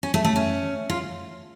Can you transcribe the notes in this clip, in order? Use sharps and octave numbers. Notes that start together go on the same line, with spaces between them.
C#4
A3
A3
C#4
F4